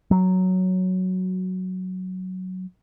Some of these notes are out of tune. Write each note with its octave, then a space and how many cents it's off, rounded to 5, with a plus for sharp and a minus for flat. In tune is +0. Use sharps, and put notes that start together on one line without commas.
F#3 +0